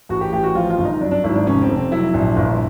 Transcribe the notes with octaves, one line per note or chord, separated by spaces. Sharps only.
A1 F#4
G4
A1 G4
F#4
F3 F4
F4
G1
D#4
F#3 D4
D4
G#1 E4
D4
F1 C#4
C4
F1
C4
F#3 E4
A#1
G1